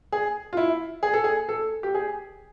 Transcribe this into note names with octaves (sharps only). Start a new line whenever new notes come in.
G#4
F4
E4
G#4
A4
G#4
A4
G4
G#4